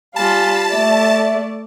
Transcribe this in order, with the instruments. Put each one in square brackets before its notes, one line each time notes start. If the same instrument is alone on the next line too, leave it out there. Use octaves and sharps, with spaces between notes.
[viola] G3 F4 [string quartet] F5 B5 [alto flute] G#5 [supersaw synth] A5
[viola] A3 [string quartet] D5 [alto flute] E5